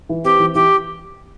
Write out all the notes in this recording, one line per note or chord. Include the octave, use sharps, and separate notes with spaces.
E3
C4 G4
E3
E3 G4